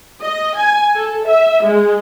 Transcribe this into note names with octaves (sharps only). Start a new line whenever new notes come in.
D#5
G#5
A4
E5
G#3